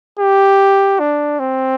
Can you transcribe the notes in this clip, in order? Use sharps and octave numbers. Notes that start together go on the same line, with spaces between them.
G4
D4
C4